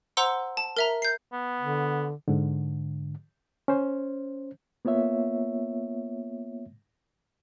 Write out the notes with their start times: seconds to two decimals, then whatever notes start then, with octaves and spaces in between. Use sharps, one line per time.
0.17 C5 F#5 A#5 C6 E6
0.57 A5
0.77 A#4 E5 A#5
1.02 G6 C7
1.33 B3
1.60 D3
2.28 G#2 D3
3.68 C#4 C5
4.85 A#3 B3 F4 C#5 E5